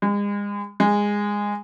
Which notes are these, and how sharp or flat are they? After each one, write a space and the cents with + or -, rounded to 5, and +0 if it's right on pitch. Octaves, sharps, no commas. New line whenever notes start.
G#3 -35
G#3 -15